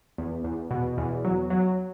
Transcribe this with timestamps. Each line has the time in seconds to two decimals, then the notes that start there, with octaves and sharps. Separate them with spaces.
0.18 E2
0.44 E2
0.71 B2
0.97 E2
1.25 F#3
1.50 F#3